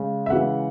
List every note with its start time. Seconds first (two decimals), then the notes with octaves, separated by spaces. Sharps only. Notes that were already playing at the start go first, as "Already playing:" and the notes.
Already playing: C#3 G#3
0.26 E5
0.30 C#3 E3 G#3 F#5